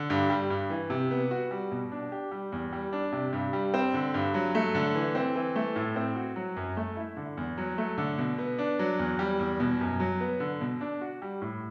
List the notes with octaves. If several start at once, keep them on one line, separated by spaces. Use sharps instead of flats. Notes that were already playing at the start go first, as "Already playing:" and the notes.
Already playing: D3
G2
G3
G2
E3
C3
B3
F#4
G3
B2
D4
G4
G3
E2
G3
D4
C3
G2
G3
C4
D3
G2
F#3
A3
D3
E3
C4
E3
A3
A2
C4
F#4
F#3
F#2
A3
E4
D3
E2
F#3
A3
D3
B2
B3
D4
F#3
E2
G3
E2
B2
F#2
F#3
B3
D3
B2
D4
F#4
G3
A2